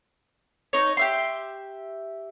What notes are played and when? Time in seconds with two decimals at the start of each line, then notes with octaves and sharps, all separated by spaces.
0.73 D#4 C#5
0.97 G4 E5 C6